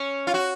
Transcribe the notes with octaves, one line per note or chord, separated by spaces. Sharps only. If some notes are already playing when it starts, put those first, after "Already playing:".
Already playing: C#4
F4
F#4